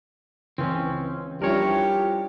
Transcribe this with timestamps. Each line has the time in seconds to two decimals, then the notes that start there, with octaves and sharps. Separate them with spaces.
0.58 C#2 E3 C4 C#4
1.42 F3 G3 C#4 D4 E4 G4 A#4 C#5